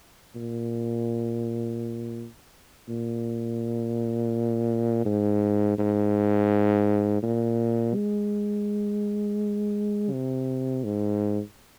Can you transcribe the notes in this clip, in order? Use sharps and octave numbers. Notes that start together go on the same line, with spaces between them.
A#2
A#2
G#2
G#2
A#2
G#3
C3
G#2